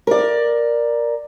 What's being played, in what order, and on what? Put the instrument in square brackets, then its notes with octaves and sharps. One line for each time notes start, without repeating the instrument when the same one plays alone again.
[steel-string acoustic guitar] A#4 D5